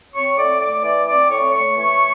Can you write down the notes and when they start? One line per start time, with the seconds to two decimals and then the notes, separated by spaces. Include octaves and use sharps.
0.13 C4 C#5 C#6
0.37 A2 D5 D6
0.60 A3 D5 D6
0.83 E3 D5 D6
1.07 C4 D5 D6
1.30 A2 C#5 C#6
1.54 A3 C#5 C#6
1.77 E3 C#5 C#6